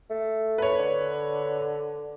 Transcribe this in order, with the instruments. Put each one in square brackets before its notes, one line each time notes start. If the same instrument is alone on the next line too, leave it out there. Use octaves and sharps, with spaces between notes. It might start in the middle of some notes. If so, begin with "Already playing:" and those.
[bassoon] A3
[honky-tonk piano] B4 C#5
[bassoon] D3